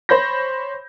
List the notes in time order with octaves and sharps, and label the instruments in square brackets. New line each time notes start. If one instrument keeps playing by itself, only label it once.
[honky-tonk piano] C5 C#5 B5 G6 A#6